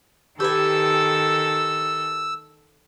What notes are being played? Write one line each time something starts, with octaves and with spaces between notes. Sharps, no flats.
D#3 G4 A4 B4 G#5 E6